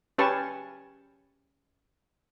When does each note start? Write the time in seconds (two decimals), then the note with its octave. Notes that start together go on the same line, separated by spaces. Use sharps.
0.18 C#4 G4 B4 A5 C#6